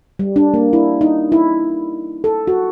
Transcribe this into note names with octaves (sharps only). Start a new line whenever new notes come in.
G3
D4
A#3
E4
D#4
E4
A4
F#4